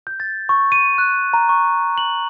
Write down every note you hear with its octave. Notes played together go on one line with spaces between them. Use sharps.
G6
A6
C#6
D#7
F#6
A#5
C#6
F#7